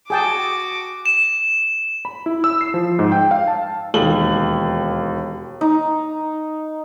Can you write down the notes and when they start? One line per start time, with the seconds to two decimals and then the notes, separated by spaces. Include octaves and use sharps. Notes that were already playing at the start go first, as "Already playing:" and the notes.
0.10 F#4 G#4 G5 A5 D6
1.06 E7
2.05 B5
2.26 E4
2.44 E6
2.61 C7
2.74 F3
2.99 G#2
3.12 G5
3.31 F5
3.48 A5
3.94 E1 D#2 F#7
5.61 D#4